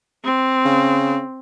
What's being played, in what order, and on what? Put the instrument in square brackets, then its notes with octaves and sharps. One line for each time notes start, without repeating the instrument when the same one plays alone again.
[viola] C4
[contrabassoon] C#3